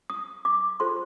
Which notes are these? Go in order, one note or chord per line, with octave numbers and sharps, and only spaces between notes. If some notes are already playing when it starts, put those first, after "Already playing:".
D#6
D6
F4 A4 C5 C6